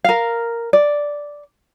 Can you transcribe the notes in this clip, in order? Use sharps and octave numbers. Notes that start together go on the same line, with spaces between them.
A#4 F5
D5